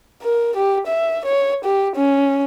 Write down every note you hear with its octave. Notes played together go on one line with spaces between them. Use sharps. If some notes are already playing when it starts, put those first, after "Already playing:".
A#4
G4
E5
C#5
G4
C#4